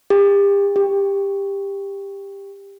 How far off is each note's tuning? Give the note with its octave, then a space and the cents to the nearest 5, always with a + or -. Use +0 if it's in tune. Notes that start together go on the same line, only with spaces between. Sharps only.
G4 +35
G4 +15